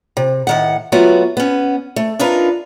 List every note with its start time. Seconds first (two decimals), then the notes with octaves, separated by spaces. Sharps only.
0.17 C3
0.47 A2 D#3 F#5
0.92 F#3 A3 B3 F4 F#4
1.37 B3 C#4
1.96 A3
2.19 D4 D#4 F4 A#4 B4